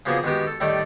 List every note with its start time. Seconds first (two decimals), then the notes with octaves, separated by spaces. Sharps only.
0.06 C#3 F3 A#3 B3 F#4 G#4
0.23 D#3 G#3 B3 F#4 G4
0.47 A4
0.61 A2 D#3 G3 A4 D5 D#5